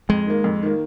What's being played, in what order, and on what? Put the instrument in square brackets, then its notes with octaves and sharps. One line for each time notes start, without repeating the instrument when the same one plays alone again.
[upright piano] F2 [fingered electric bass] G#3
[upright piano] D#3 A#3
F2
D#3 A#3